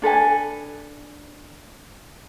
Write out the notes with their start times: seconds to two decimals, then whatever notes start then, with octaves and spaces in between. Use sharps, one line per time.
0.02 D4 A4 B4 G#5